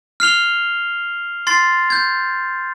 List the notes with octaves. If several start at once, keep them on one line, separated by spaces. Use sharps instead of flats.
F6 C7 F7 G7
C6 A6 C7
G6 G#6